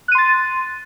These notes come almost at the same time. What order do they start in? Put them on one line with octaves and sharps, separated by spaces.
F#6 D#7 C6 A6